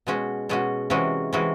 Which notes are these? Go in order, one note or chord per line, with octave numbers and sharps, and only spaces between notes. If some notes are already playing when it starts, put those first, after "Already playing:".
B2 G#3 C#4 F#4
B2 G#3 C#4 F#4
C3 E3 G#3 C#4 F#4
C3 E3 G#3 C#4 F#4